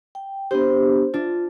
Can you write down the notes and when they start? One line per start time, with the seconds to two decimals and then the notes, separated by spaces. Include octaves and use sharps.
0.15 G5
0.51 B3 D4 G4 C5
1.14 D4 F4